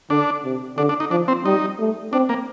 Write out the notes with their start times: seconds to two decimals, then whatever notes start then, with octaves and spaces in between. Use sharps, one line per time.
0.10 D3 D4
0.45 C3
0.77 D3 D4
0.89 D4
1.00 D#4
1.11 F3 D4
1.28 C4
1.45 G3 D#4
1.79 A3
2.13 C4 D4
2.29 A#3